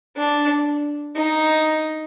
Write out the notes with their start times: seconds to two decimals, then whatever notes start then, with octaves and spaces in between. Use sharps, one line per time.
0.17 D4
1.16 D#4